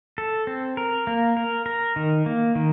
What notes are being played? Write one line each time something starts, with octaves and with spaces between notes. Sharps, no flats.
A4
C4
A#4
A#3
A#4
A#4
D#3
A#3
D#3